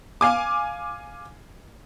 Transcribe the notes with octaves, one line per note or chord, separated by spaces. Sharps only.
F5 G#5 D6